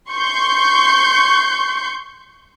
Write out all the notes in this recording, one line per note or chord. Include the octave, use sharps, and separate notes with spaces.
C6 C#6 G6